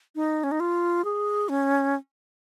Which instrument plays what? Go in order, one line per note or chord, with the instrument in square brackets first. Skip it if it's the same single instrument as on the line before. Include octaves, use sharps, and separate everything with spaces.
[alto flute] D#4
C#4
D#4
F4
G#4
C#4